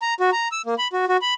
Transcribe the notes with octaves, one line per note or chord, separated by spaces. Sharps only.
A#5
F#4
A#5
E6
A#3
B5
F#4
F#4
B5